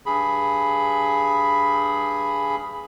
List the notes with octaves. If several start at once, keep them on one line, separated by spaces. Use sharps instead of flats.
G2 G#4 B5